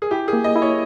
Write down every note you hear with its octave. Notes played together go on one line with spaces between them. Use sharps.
G#4
E4 G4
G#4
A#3
D#5
E4
C#5